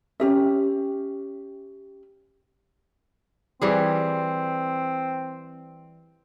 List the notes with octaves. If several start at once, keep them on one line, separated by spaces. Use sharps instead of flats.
C#4 G4 E5
E3 G3 C4 G#4